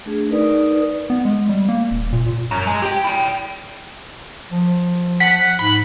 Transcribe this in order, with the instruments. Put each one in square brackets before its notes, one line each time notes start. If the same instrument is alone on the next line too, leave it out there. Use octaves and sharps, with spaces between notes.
[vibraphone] A3 D4 G#4
D#4 A#4 B4 D5 D#6
[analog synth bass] B3
G#3
G3
A#3
D#1
A#2
A#2
[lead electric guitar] F#2
G#3
G4 G5
E4 G5
[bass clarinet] F3
[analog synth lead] F#5 [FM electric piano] B6
[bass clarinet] G#2 [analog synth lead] B5